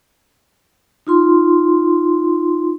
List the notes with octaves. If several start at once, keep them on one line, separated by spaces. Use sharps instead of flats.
D#4 F4 C6